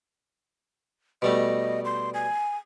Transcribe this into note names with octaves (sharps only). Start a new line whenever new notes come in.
B2 G3 A3 D#5
C6
G#5